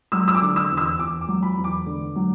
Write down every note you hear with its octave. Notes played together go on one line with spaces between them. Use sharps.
F#3 E6
E6
D6
D3
E6
E2
E6
E2 D6
D6
F#3
B5
E2
D6
D3
F#3